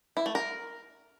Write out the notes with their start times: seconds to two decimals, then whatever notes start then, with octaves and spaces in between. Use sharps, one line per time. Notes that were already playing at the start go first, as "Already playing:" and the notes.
0.17 E4
0.26 A3
0.35 A#4